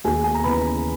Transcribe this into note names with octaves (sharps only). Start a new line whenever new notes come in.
D#2 G#4 G#5
G#5
A#5
C#3 E3 B4 B5